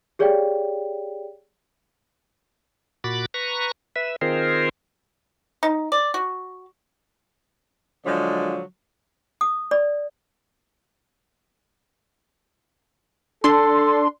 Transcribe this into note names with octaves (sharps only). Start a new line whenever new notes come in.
G4 G#4 C#5 D5 F5 G5
A#2 F#4 B5 D6 A6
B4 A#5 C#6
B4 E5
D#3 C4 F4 G#4 A#4 C5
D#4
D5
F#4
D3 F3 F#3 G#3 F4 D5
D#6
D5
D4 A4 C6